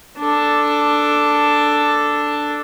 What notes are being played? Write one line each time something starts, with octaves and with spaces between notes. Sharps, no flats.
D4 A4